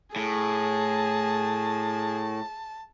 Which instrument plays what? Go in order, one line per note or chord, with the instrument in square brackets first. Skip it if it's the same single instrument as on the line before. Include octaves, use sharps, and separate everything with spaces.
[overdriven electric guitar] A2 [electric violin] G#4 [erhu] A5